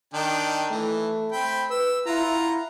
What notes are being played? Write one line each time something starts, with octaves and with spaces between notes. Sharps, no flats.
D#3 D4 G5
E3 A3
C4 G5 B5
B4 E6
E4 F4 F#5 A#5